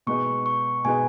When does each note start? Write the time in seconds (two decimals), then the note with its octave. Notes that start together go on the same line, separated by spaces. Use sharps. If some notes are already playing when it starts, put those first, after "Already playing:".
0.07 B2 G#3 D#4 B4 C#6
0.46 C#6
0.85 B2 G#3 D#4 B4 G#5